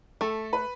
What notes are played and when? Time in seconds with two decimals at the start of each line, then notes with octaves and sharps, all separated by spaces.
0.21 A3 A4
0.53 B4